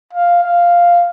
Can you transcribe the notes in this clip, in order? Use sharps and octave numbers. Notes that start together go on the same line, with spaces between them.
F5
F5